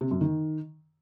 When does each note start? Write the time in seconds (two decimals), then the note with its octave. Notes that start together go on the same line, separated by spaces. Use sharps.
0.01 C3
0.11 F#2
0.21 D#3